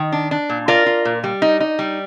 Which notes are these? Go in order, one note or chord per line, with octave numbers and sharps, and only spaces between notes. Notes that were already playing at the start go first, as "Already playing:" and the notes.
Already playing: D#3
D4
D4
A#2
F4 A#4 D5
F4
A#2
G3
D#4
D#4
G3